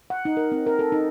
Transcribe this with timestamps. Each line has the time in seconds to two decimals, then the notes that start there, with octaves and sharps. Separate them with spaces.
0.10 F#5
0.25 D#4
0.37 A#4
0.52 C4
0.66 A#4
0.79 A4
0.92 D#4